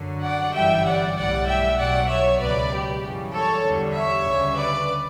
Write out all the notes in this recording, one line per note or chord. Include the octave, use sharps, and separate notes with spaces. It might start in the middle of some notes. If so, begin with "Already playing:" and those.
Already playing: F#2 D3 F#3
D5 F#5
G1 F#2 E3 G3 E5 G5
D5 F#5
B1 A2 G3 D5 F#5
E5 G5
B1 B2 F#3 D5 F#5
C#5 E5
C#2 B2 F#3 B4 D5
G4
F#2 C#3 E3 G3
A4 C#5
E2 D3 G3
C#5 E5
D2 C#3 G3
B4 D5